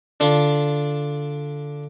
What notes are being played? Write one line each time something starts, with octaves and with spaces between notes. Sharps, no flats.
D3 D4 F4